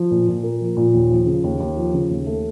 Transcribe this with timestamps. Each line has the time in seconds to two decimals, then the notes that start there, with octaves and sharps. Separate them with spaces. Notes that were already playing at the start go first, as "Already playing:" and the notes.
Already playing: F3
0.11 A#2
0.28 A#2
0.43 A#3
0.60 F3
0.77 A#2
0.94 D#2
1.11 F3
1.27 C#3
1.44 D#2
1.60 D#2
1.77 F3
1.93 C#3
2.10 D#2
2.26 A3